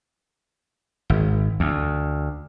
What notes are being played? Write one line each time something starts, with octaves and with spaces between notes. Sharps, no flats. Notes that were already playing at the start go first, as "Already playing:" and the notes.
G#1
D2